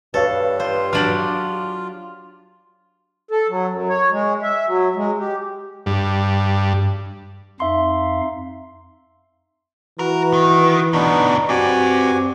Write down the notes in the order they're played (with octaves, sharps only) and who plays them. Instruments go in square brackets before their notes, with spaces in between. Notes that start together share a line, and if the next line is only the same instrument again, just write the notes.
[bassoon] G2 [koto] A4 [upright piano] B4 C#5 F5
[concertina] F4 [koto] C5
[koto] F#3 D4 G4 [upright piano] F6 F#7
[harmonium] A4
F#3
F#2
C#5
G#3
E5
F#3
G#3
G4
[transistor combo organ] G2
[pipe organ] F2 D#4 F5 [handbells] E5 C6
[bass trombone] E3 [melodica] F#4 B4 [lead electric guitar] A#4
[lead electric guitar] D#3
[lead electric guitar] D2 B2 [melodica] B3 D4 D#4
[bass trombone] C4 [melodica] F#4 G4 G#5 [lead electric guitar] B4 D5